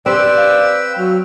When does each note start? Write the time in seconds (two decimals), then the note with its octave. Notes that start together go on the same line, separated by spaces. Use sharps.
0.06 C4 G4 B4 D5 G5 E6
0.37 F5
0.98 F#3 F6